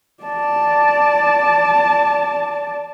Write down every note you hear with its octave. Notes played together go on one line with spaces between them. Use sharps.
D5 A5